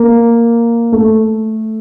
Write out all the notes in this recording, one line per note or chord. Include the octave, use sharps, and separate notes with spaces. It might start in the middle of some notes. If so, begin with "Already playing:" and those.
Already playing: A#3
A3